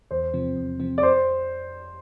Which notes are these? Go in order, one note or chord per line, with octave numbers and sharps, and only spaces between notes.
E2 C5
C3 F3 C4
E2
C3 F3 C4
D5
F2 C5